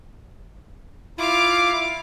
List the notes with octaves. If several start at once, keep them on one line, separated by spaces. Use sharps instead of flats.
E4 F4 F5 D6